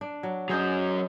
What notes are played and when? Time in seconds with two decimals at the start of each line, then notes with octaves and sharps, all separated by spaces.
0.01 D4
0.23 F#3
0.49 F#3 C#4 G#4 C5 D#5